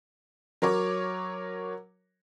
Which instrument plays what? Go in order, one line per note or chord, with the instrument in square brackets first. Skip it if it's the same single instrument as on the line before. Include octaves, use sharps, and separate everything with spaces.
[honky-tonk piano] F#3 A#4 C#5 D6